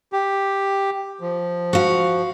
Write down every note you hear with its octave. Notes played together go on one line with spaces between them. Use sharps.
G4
F3
F#4 F5